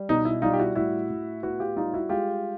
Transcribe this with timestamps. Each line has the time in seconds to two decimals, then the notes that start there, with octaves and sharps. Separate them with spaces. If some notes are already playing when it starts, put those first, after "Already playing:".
Already playing: G3
0.09 B2 D#4
0.25 E4
0.42 G3 D#4 F4
0.53 G4
0.59 E4 F#4
0.75 A2 E4 F#4
1.10 A2
1.43 B3 E4 F#4
1.59 F4 G4
1.76 G3 D#4 F4
1.94 E4 F#4
2.09 G#3 F4 G4